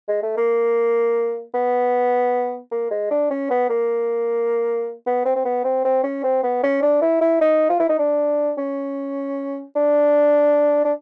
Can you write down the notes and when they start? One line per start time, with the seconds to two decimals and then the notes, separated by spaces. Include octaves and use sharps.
0.08 G#3
0.22 A3
0.37 A#3
1.54 B3
2.71 A#3
2.91 G#3
3.11 D4
3.30 C#4
3.50 B3
3.70 A#3
5.07 B3
5.25 C4
5.36 C4
5.45 B3
5.64 C4
5.85 C4
6.03 C#4
6.24 C4
6.43 B3
6.63 C#4
6.82 D4
7.02 E4
7.21 E4
7.41 D#4
7.69 F4
7.79 E4
7.89 D#4
7.99 D4
8.58 C#4
9.76 D4
10.85 D4